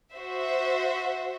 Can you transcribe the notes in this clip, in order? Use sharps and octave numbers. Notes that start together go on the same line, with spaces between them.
F#4 C5 E5